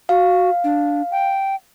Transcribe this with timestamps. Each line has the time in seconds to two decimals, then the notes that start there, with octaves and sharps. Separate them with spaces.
0.09 F#4 F5
0.64 D4
1.11 G5